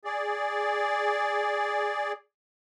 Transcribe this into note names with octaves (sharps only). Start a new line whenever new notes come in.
G#4 D5